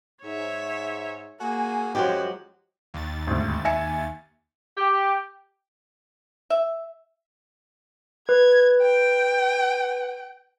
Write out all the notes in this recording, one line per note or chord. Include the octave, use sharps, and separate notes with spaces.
G#2 C#5 E5
A#3 F#4 G#4 G#5
F#2 F3 F#3 G#3 F#4 G4
D#2 A6
G#1 D2
E5 G#5 C#7
G4
E5
B4 G#6
G5